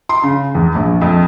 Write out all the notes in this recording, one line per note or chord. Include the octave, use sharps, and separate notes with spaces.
C6
C#3
E2
A#1
F2